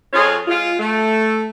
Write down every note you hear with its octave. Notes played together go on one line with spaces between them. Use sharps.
F2 F4 G#4 C#5
G#3 F4
A3